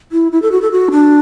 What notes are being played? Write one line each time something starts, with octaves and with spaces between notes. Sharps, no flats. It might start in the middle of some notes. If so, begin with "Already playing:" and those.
E4
E4
A4
F#4
A4
F#4
D4